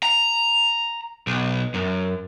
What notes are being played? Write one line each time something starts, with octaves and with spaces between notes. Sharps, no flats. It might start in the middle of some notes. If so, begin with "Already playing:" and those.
A#5
B1
F#2